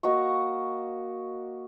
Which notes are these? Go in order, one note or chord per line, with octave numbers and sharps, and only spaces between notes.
A#3 F#4 D#5 C#6